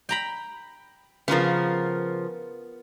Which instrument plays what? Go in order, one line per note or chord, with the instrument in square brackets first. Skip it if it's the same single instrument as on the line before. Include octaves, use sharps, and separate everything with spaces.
[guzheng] G5 A#5 B5
[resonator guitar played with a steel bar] C#3 F3 [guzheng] B3 F4 A#4